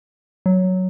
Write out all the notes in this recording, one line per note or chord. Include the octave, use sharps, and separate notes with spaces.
F#3